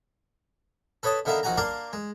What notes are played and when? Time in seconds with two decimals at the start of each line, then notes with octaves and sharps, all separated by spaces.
1.03 A4 B4 C#5 D#5 A5
1.25 D3 D#3 B3 E5 F5 A#5
1.43 A#1 D#3 F#4 F#5 G#5 A#5
1.57 A#3 D4 A#4 D5 A#5 C6
1.93 G#3